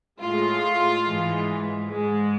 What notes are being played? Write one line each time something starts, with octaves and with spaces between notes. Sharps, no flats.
A2 G#3 F4
G#2 E3 G#3
G#2 G#3